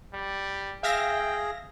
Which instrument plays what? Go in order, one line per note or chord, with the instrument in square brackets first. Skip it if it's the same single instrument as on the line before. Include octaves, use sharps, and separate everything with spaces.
[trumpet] G3
[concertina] G#4 [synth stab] E5 F5 A#6 [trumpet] G5